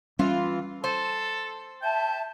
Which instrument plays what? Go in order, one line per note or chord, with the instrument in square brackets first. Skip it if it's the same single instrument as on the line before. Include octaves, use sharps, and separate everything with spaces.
[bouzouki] E3 F4 [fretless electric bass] G3 C#4
[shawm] A4 [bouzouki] C5
[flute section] E5 A5 [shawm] G5